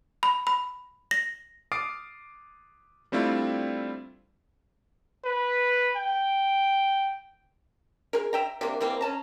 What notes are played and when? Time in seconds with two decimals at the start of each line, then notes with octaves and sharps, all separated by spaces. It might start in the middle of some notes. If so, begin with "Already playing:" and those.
0.23 B5
0.47 B5
1.11 A#6
1.72 D6 D#6 F6 A6 C7 D7
3.12 G3 A3 C4 D4 E4 F4
5.25 B4
5.97 G5
8.13 G#4 A#4
8.33 E5 G5 A#5
8.61 C3 A#3 D4
8.81 E3 G3 A#3 C4
9.01 C#4 A5 A#5